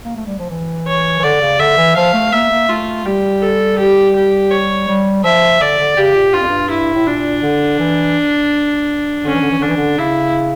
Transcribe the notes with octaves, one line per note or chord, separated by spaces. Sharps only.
A#3
A3
G3
F3
E3
C#5
E3
D3 D5
C#3
D3 E5
E3
F3 F5
A3
A#3 E5
A#3
A3 F4
G3 G4
A4
G4
G4
C#5
G3
F3 E5
D3 D5
D3
C#3 G4
A#2
G2 F4
F2
G2
E4
A2
A#2 D4
D3
E3
D3 C#4
E3
D3
E3
D3 D4
E3
D3
C#3 E4